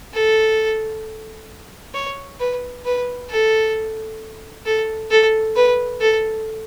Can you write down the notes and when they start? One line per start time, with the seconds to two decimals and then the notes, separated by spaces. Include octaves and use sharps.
0.14 A4
1.94 C#5
2.40 B4
2.85 B4
3.30 A4
4.66 A4
5.11 A4
5.56 B4
6.01 A4